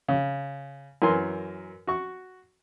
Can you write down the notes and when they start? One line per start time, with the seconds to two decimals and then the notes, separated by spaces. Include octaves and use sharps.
0.08 C#3
1.02 F#2 E3 A#4 G#5 C6
1.87 F#4 C#6